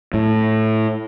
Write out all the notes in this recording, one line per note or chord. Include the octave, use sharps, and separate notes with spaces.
A2